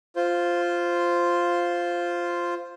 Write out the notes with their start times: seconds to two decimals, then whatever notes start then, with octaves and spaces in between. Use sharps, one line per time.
0.16 F4 C5